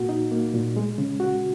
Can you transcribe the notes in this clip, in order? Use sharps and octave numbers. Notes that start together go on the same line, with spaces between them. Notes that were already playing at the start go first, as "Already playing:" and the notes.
Already playing: A#2 A#3 F#4
D#4
A#3
A#2
G#3
C#3
F#4